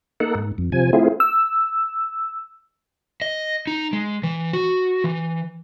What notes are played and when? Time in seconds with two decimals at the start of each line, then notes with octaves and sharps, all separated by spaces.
0.20 A#3 D#4 A4 F#5
0.35 G#2
0.58 F2
0.72 C3 F3 G#5
0.93 A3 C4 E4 F4 G#4
1.20 E6
3.22 D#5
3.67 D#4
3.93 G#3
4.23 E3
4.53 F#4
5.04 E3